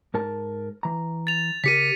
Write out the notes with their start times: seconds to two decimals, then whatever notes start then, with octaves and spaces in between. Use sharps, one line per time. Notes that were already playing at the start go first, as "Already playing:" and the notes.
0.14 G#2 A#4 A5
0.83 E3 A#5
1.27 A6 F7
1.64 C#3 G4 A#4 B6 C#7 D#7